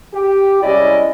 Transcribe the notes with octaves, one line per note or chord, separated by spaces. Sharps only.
G4
C2 G#3 C#4 E4 D5 D#5